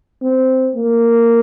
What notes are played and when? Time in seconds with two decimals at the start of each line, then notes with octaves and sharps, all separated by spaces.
0.22 C4
0.75 A#3